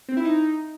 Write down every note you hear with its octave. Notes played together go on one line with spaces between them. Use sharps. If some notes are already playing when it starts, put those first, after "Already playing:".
C4
E4
D#4